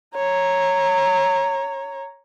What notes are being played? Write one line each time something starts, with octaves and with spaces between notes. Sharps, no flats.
C#5 A#5